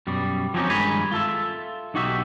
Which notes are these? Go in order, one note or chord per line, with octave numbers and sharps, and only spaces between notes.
F#2 B2 G3
F3 F#3 C4 C#4 D#4 G4
G2 D#3 G#3 D#4 G#5 B5
F4 A4 E5
B1 D#4 F#4 G4 E5